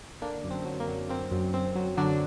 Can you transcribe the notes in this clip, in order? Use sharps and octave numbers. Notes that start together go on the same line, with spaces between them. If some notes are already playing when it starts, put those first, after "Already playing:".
D3 A#3 D4
F#2
C4
F#3
A#3
F#3
A#3 C4
F#2
F#2 C4
F#3
D3 F#3 D4